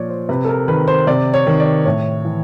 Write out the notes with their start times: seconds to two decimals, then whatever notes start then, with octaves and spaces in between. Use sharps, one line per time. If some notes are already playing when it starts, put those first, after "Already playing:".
Already playing: A#2 F3 C#5 D5
0.09 C5
0.29 C3 B4
0.44 A4
0.49 A#4
0.68 D#3 B4
0.88 C5
1.07 C3 D5
1.34 C#5
1.47 D#3
1.60 D5
1.85 A2 C#5
2.25 E3